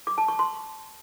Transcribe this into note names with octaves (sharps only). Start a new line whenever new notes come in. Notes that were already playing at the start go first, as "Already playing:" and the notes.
D6
A5
C#6
C6